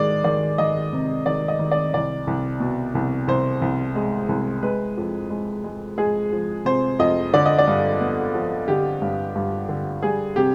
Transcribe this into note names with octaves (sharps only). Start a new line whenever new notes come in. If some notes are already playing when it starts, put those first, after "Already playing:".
Already playing: D#3 G#3 D5
D#3 D5
D#3 D#5
C3
D#3 D5
D#5
D#3
D5
C2 D5
C2
B2
C2
C2 C5
C2
G#3
C2
G#3 B4
F2
G#3
G#3
G#3 G#4
F3
C3 C5
F2 D#5
D3 D5
D#5
D5
G2
B3
F3
D3 G4
G2
G2
D3
G3 G#4
C3 G4